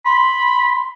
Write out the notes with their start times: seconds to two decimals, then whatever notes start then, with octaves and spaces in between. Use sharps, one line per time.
0.05 B5 C6